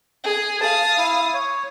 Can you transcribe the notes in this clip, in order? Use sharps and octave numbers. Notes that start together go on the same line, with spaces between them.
G#4
F5 A5 D#6
E4
C#5